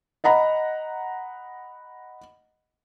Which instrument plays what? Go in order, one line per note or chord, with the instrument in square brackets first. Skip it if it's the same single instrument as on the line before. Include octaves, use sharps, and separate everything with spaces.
[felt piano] D#5 F#5 A#5 B5